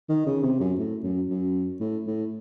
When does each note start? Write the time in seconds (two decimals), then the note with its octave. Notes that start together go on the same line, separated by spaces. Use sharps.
0.09 D#3
0.26 C#3
0.43 C3
0.60 F#2
0.78 A2
1.03 F#2
1.30 F#2
1.80 A2
2.07 A2